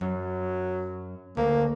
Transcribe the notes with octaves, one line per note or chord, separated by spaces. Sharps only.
F#2 F#3
D2 A#3